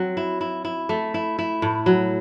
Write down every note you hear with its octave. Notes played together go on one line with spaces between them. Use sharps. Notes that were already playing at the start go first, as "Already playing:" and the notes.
Already playing: F#3 C4
E4
E4
E4
A3
E4
E4
A2
F#3